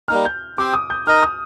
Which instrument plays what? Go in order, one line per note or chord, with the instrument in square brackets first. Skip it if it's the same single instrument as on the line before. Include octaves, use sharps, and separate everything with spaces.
[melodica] G3 A#3 D#4 [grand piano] F6
[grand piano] G6
[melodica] C4 G4 C5 [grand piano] D6
[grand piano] D#6
G6
[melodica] D#4 A#4 D#5 [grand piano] F6
[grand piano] D#6